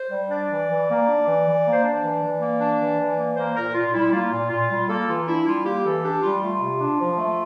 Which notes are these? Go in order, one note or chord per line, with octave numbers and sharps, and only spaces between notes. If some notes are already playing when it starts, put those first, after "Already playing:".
Already playing: C5
G3
D4 D5
E3
E3
A#3
D4
E3
E3
A#3
C5
D4 D5
E3
E3
A#3
D4
E3
E3
A#3
A#3 C5
A#2 A#4
A#2 F4
G3 E4
A#3 F4
A#2
A#2 F4
G3
A#3 A4
E3 F4
D4 E4
G3 F4
A#3 G4
E3 A4
D4 G4
G3 F4
A3 F4
C3
D4
F3
A3